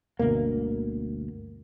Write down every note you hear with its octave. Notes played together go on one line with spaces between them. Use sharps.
G1 D2 B2 A#3